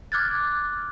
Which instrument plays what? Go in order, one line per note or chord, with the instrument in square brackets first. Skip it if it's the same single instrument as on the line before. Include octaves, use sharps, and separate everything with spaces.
[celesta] D6 F6 F#6 G#6 A6